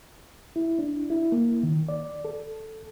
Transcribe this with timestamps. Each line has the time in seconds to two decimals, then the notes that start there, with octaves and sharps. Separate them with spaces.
0.56 E4
0.79 D4
1.10 E4
1.32 A#3
1.63 D#3
1.89 D5
2.25 A4